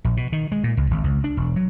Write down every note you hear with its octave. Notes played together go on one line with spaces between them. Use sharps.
A#1
B2
D#3
G#3
A#2
C#2
G#1
C#2
D4
E1
F#3